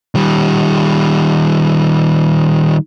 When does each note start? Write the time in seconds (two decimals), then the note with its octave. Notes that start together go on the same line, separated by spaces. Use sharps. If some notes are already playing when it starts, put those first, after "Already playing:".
0.15 D#3 G3